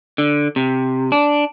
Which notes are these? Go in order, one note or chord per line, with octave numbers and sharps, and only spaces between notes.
D3
C3
D4